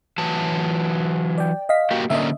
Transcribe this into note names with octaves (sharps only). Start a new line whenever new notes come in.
E3 F#3 A5
D5 G5
D#5 F5 B6
A#3 F#4 G4
D3 A#3 C#4 D#5 E5